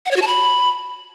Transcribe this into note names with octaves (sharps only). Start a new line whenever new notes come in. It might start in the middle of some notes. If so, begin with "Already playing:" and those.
F#5
C#5
F#4
A5
B5